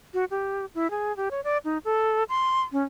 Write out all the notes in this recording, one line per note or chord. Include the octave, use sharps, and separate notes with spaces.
F#4
G4
E4
G#4
G4
C#5
D5
D#4
A4
C6
C#4